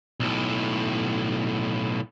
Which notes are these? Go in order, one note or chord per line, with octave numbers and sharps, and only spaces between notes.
B1 A2